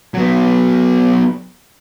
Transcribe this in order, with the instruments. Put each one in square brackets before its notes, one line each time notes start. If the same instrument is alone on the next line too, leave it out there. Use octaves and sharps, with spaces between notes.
[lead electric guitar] F#3 B3